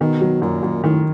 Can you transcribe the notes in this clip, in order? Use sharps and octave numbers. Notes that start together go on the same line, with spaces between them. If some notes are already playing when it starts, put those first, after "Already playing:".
B2 D#3
F#3
F#2 A#2
F#2
A2 D#3